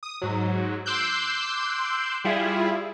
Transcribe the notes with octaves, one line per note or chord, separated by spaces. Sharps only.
D#6
G#2 F#3
C6 D6 E6 F#6 G6
G3 E4 F4 G#4